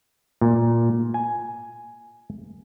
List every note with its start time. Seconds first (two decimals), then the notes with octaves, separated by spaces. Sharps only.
0.41 A#2
1.14 G#5